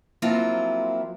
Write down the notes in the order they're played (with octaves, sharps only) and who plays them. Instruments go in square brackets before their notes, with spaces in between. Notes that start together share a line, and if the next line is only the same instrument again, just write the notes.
[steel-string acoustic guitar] F3 F#3 A#3 C4 E4 F4